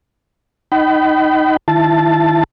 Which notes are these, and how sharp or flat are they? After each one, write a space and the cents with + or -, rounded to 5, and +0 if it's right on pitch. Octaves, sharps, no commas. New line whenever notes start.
D#4 +0 G5 -45 B5 +20
D#3 +0 E4 +20 A5 +0